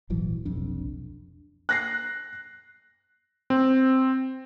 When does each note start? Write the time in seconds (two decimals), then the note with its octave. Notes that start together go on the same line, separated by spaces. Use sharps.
0.10 D#1 G#1 E3 F#3
0.45 F1 B1 F2 D4
1.69 F#6 A#6 C7
3.50 C4